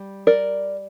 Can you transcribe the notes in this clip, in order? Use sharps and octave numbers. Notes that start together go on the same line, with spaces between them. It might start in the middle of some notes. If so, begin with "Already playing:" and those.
Already playing: G3
A#4 D5